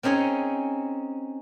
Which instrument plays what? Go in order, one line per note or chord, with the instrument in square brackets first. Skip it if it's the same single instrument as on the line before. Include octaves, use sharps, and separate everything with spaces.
[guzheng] C4 C#4 D#4 G#4 C#5